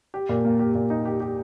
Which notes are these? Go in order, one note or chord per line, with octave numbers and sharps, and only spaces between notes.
G4
A#2
A#3
G4
A#2
D#4
G4
G4